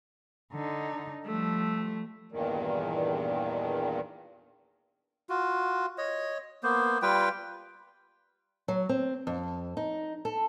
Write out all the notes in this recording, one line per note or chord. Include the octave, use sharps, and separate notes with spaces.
D3 D#4
F3 G3 A3
E2 G2 A#2 D#3
F4 F#4
C#5 D#5
A#3 B3 C5
G3 F4 B4 G5
F#3
C4
F2
D#4
A4